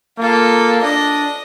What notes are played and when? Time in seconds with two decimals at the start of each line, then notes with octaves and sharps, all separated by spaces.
0.18 A#3 F4 A4
0.83 D4 D#5